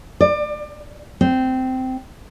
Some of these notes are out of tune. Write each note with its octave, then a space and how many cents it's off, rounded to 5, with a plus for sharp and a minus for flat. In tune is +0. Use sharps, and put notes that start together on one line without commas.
D5 +30
C4 -15